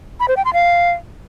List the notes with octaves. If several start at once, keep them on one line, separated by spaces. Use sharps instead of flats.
B5
C5
G5
C6
F5